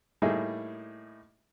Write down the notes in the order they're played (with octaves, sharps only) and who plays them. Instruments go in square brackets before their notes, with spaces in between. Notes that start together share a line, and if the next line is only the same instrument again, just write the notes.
[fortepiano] A2 G3 A#3 D#4 E4 G#4